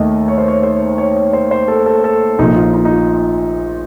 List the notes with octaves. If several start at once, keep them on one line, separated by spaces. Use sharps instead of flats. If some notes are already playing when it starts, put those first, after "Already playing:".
Already playing: D#2 D#3 A3 D#5
C#5
C5
C#5
C5
C#5
C#5
C5
C5
A4
A4
A4
A#1 A#2 F3 D#4
F4
D#4
D#4
F4